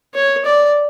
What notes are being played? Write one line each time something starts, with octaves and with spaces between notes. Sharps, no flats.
C#5
D5